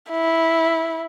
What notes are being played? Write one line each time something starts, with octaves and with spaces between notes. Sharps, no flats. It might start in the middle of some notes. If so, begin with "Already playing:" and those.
E4